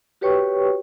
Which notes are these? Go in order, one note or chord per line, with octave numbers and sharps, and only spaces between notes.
F#4 G4 B4 C#5 G5 C#6